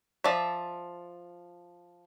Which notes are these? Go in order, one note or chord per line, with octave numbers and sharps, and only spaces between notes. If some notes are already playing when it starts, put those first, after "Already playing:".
F3 D5 E5